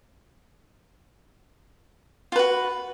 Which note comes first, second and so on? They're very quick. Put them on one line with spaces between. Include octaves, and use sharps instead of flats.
F4 B4 F#4